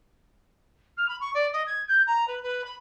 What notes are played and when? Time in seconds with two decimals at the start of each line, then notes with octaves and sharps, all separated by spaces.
0.97 F6
1.09 B5
1.21 C#6
1.34 D5
1.53 D#5
1.67 G#6
1.88 G6
2.07 A#5
2.28 B4
2.43 B4
2.64 B5